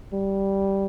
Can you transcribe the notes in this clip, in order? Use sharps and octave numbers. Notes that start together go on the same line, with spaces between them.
G3